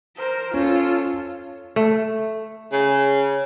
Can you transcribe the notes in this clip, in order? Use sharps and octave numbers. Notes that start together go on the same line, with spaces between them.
A#4 C5
C#4 F4 A4
A3
C#3